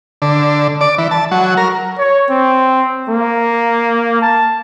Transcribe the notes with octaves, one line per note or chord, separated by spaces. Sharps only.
D3
D5
E3
A5
F#3
A#4
C#5
C4
A#3
A5